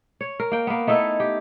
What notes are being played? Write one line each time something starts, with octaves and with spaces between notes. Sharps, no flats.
C#5
A#4
A#3 G5
A#3 B3
A3 D#4 E4 A4
G4